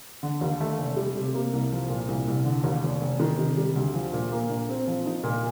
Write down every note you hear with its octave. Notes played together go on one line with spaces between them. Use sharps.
D3
D#2
A3
F1
G3
C3
A#3
C2
F3
A#2
C2
C2
D3
D#2
F1
F1
D#3
C3
G3
D2
F3
A#2
A#3
A#1
C4
F3
D#4
A#2